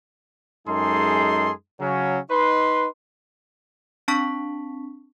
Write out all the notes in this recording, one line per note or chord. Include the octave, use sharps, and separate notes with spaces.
F#2 G#3 D#4 G#4 A4 C6
C#3 F#3 C#4
D#4 B4 C6
C4 D4 A5 C#6 B6